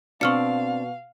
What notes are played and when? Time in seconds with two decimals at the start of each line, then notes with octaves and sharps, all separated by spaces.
0.21 B2 C4 D4 F5 C#6 F6 C#7